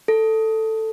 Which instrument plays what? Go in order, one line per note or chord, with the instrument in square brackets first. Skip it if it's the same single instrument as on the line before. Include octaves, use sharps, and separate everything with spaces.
[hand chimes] A4